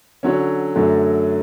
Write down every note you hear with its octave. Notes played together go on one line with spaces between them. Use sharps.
D3 F#3 C#4
F#2 D3 F#3 A3